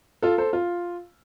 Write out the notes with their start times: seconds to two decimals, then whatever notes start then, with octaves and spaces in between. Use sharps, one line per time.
0.22 F4 A4
0.38 A4 C5
0.53 F4